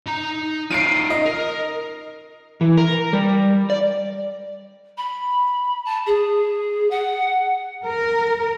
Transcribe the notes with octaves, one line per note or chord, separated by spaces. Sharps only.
D#4 A#5
D#4 F4 C7 D7 D#7
D#5
A#4
E3
A#4
G3
D5
B5
A5
G#4
F#5
A#4